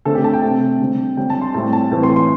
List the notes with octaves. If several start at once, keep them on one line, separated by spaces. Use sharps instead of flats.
D3 A3 C4 A4
G4
A5
G5
C3 A3 C4
D3 G3 C4
D3 G3 C4 G5
A5
C6
A2 G3 C4 A5
A5
A2 E3 C4
C6
C6